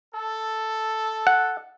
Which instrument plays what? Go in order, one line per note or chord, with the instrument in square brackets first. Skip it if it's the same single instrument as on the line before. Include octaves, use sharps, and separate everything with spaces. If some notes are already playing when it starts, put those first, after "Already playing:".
[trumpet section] A4
[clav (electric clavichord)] F#5